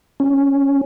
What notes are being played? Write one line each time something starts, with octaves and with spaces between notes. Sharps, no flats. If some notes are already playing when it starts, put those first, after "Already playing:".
C#4